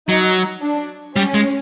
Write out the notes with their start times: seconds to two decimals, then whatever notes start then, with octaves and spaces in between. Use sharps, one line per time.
0.08 F#3 D#4
0.62 D4
1.16 G3 C#4
1.34 G#3